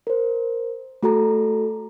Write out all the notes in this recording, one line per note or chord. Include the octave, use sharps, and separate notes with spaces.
A#4 C5
A3 F#4 A4 A#5